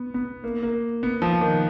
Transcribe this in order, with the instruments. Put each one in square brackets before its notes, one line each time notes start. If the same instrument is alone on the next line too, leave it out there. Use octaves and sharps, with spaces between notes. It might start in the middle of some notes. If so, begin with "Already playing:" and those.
Already playing: [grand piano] B3
B3
A#3
A#3
B3
F3
D#3